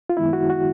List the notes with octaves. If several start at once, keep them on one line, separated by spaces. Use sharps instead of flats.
F4
F#2 D#3 G#3 B3 E4
F#4
F#4